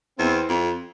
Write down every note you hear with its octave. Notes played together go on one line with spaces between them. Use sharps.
E2 C4
F2